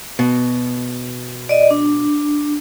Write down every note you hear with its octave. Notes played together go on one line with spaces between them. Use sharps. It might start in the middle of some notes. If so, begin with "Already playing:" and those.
B2
D5 D#5
D4